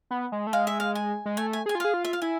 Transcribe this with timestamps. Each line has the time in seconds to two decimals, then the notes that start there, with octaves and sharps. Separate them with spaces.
0.11 B3
0.32 G#3
0.47 A3
0.53 G#3 F5
0.67 E5
0.80 F5
0.95 G#5
1.26 G#3
1.37 A3 G#5
1.53 G#5
1.66 G#4 G#5
1.75 F4
1.80 G#4 F5
1.94 F4
2.05 E5
2.13 F5
2.22 E4 G#5